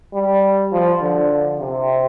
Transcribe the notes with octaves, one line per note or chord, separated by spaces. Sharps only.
G3
F3
D3
C3